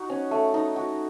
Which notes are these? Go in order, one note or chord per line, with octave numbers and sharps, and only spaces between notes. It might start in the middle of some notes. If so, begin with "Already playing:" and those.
Already playing: D#4 F#4
C#4
A3
D#4
F#4